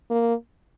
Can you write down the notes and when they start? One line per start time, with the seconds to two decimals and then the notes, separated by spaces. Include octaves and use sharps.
0.11 A#3